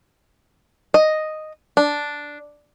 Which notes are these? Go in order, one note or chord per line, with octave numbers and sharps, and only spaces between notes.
D#5
D4